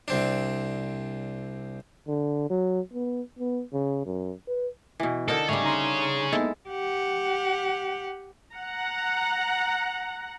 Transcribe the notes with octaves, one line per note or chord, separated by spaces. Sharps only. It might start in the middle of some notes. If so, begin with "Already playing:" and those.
C2 C4 D4
D3
F#3
B3
B3
C#3
F#2
B4
B2 E3
D3 D#4 A4 A#4
G#2 G3 A3 G#4 C#5
D#4 A#5 C6
G#3 A#3 B3 D#4 E4 A4
G4 F#5
F#5 A#5